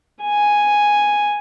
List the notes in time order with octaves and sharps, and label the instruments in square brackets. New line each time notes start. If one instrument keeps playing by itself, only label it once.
[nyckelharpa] G#5